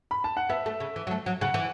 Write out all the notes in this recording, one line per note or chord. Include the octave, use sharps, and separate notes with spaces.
B5
A5
F#5
B3 E5
A3
C#3
E3
F#3
A3
F#3
C#3 F#5
E3